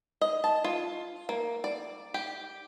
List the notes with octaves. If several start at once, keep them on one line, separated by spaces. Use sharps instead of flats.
D#5
A5
F4
A#3
D5
G4